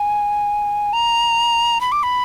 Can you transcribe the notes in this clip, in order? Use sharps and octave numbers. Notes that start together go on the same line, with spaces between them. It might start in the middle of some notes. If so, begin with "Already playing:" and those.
Already playing: G#5
A#5
B5
D6
B5